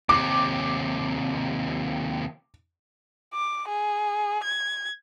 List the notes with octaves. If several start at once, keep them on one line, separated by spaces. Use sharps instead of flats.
D#2 C3 D6
D6
G#4
G#6